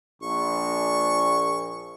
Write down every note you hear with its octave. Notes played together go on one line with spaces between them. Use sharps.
A#1 C#6